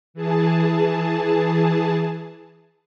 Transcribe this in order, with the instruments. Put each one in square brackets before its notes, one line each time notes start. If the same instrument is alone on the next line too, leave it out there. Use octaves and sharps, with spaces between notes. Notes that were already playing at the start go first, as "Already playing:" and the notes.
[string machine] E3 G#4 A5